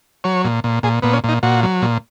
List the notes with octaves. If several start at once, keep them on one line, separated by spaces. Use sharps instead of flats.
F#3 C#5
A#2
A#2
A#2 G#4
A#2 B3
C#4
A#2 D#4
A#2 F#4
F#3
A#2